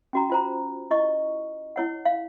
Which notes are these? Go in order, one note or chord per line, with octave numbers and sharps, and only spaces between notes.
C#4 F#4 A#5
F4 C5 A#5
E4 D#5 C#6
E4 C#5 F#5
F5